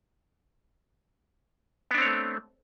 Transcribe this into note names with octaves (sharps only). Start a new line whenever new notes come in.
A3 B3 C4 D4 C#5